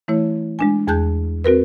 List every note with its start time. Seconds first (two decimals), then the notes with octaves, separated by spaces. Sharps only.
0.08 E3 A3 E4 C#5
0.59 G#3 D4 G#5
0.87 E2 G#4 A5 F#6 G6
1.44 C4 F#4 A#4 B4